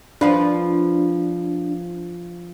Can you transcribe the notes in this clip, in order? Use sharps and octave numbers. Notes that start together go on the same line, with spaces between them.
F3 D4 F4 B4